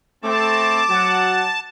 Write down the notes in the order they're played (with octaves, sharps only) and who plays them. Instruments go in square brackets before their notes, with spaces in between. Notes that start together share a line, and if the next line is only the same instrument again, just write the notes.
[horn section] A3 C4 [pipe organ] A5 [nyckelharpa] D6
[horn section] F#3 F#5